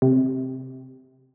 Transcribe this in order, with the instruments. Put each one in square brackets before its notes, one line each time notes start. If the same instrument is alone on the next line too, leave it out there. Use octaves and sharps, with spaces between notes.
[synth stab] C3